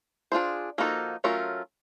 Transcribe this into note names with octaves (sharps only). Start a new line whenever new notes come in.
D4 F4 G#4 C5
F3 A#3 D#4 F#4 A4
F#3 A3 C#4 F4 A#4